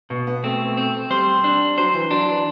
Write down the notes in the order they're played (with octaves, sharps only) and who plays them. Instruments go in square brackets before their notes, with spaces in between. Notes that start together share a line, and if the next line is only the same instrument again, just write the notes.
[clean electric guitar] B2 [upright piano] B3
[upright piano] B3
[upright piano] A3 [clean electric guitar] C4
[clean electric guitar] C4
[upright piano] G3 [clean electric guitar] C5
[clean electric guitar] D4
[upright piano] F#3 [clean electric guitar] C5
[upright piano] E3
[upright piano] F#3 [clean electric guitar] D4
[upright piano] E3